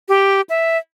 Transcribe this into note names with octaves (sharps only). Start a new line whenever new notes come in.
G4
E5